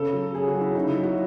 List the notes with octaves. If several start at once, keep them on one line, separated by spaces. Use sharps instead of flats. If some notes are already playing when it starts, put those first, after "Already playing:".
Already playing: C#3 A4
F#3
C#3 G#4
F#4
F#3
E4
C#3 D#4
E4
F#3
F#4